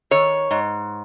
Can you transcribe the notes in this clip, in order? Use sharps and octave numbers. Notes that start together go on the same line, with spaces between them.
D#3 C#5
G#2